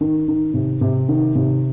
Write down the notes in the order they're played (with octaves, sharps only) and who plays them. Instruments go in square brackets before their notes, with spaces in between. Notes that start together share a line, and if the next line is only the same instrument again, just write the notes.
[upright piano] D#3
D#3
C3
C3
D#3
C3